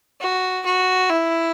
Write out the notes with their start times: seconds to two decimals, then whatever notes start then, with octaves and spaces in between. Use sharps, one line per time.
0.21 F#4
0.65 F#4
1.10 E4